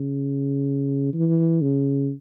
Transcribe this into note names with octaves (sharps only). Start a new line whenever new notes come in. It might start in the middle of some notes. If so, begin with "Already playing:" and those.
Already playing: C#3
E3
C#3